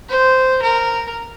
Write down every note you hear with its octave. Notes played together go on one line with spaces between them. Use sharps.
C5
A#4